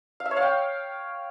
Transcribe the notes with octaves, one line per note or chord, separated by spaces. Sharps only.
F5
E5
C#5
F5
G5